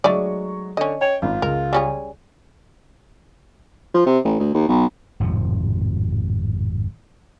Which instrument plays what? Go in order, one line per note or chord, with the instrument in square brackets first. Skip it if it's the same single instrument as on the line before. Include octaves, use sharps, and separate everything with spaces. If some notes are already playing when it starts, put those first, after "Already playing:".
[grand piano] F#3 G#3 C#6 [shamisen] A3 D#4 D5
[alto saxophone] D3 [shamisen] C#4 D#5
[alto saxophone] C#5 [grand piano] G5
[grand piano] G#1 [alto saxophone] F4
[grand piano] C#2 [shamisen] A#4
[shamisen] G3 C#4 G#4
[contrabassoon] F3
C3
A1
D2
D#2
B1
[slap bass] G#1 F2 A2 C3